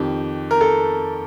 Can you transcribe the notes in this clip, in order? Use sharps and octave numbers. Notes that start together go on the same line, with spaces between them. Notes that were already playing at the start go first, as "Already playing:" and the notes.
Already playing: F2 D#3 G4
A#4
A4